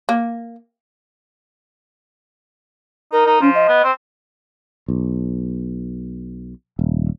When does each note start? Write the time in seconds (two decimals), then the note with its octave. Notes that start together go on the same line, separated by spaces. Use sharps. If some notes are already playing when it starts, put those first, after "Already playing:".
0.09 A#3
3.13 D#4 A#4
3.26 D#4
3.41 F3 C#4
3.55 D#5
3.68 B3
3.84 C4
4.88 B1
6.79 D#1